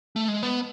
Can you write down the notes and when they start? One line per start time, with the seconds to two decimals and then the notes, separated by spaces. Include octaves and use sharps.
0.16 A3
0.28 G#3
0.43 B3